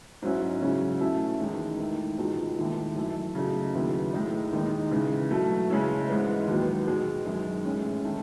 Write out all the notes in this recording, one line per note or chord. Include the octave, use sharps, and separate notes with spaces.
G#2 F#3 C#4 E4
C#3 F#3 C#4 E4
B2 A3 C#4 E4
E2 D#3 G#3 D#4
E2 D#3 A3 E4
C#2 B2 G#3 D#4
D#2 D#3 A3 E4
F#2 E3 A3 E4
C#3 F#3 A3 D#4
D#2 C#3 F#3 B3 E4
A2 G#3 D#4
D#2 D#3 G#3 D#4
C#3 E3 G#3
B2 F#3 A3
C#3 G#3 C#4 E4
G#2 E3 G#3 B3
D#2 D#3 F#3 B3
B2 G#3 B3
F#2 D#3 G#3
A2 E3 G#3 C#4
D#3 A3